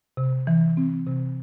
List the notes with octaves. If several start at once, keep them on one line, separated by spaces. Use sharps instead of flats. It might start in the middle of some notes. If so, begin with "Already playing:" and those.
C3
E3
C4
C3